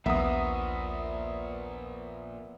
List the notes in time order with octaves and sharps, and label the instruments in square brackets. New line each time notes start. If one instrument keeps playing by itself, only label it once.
[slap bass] A#1 D#2 [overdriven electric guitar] A#2 F3 [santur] B3 [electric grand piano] E5 A#5 D#6